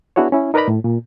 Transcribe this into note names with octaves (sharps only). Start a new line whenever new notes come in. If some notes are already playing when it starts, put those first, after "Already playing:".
B3 D4 E4 F#4 G#4 C#5
C#4 E4
D#4 A#4 B4 D5 A#5 B5
A2
A#2